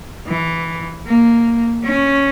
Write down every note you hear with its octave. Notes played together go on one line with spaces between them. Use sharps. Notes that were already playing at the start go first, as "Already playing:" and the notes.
E3
A#3
C#4